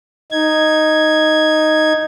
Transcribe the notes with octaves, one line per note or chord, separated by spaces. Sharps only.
D#4 G#6